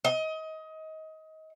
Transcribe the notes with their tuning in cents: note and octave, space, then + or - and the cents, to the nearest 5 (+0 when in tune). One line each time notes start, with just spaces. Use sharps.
D#5 +25